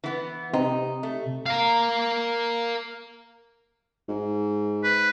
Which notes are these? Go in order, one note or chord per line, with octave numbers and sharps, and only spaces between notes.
E3 B3
C3 D#4
A3
A#4 F5
G#2
B4